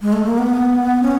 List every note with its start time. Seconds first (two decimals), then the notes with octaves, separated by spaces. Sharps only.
0.02 G#3
0.13 A3
0.26 A#3
0.38 B3
1.02 C#4